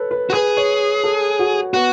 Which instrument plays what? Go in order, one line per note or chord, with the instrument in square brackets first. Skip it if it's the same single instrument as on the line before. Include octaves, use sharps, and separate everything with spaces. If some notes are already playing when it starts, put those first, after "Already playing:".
Already playing: [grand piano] A4 B4 C#5
B4
[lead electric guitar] F#4
[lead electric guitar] G#4 [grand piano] B4
[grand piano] C#5
A4
F#4
[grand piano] B3 [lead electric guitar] F#4